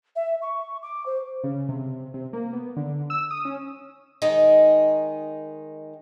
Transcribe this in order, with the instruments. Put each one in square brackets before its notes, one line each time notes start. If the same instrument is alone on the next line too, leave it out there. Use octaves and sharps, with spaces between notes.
[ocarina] E5
C#6
D6
C5
[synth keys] C#3
C3
C3
C3
A#3
B3
D3
E6
D#6
C#4
[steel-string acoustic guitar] D#3 G#3 D#4